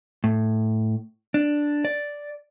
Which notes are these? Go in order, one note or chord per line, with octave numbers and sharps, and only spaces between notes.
A2
D4
D5